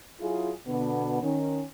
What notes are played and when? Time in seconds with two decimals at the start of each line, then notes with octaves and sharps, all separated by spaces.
0.21 F#3 E4 F4 G#4
0.66 B2 D3 B3
1.22 D#3 C#4